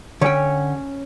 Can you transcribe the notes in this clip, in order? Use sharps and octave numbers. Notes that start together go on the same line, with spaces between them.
D3 C#4 C#5 G5